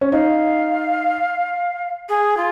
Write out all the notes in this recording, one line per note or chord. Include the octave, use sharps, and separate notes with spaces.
C#4
D#4 F5
G#4
F4